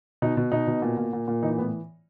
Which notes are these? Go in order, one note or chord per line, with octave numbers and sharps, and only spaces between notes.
B2 D#4
B2
B2 D#4
B2
A#2
A#2
A#2
A#2
E3 D#4
A2 B3